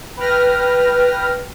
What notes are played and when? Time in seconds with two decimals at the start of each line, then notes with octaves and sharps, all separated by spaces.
0.17 B4 G5 F6 A#6